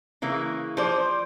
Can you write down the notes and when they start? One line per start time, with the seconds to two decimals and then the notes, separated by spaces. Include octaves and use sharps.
0.22 C#3 E3 A#3
0.77 F3 C5 D5